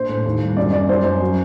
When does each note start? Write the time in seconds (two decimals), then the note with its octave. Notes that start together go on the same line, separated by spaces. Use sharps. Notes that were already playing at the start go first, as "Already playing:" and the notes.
Already playing: A#1 C5
0.09 A2
0.25 D#2
0.42 G3
0.57 F#2 D5
0.73 G3 D5
0.89 F#2 C5
1.05 F#2
1.22 F#3